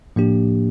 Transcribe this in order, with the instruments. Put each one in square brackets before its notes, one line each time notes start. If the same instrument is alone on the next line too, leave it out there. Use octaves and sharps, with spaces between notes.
[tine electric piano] A2 F3 A#3 D4 G4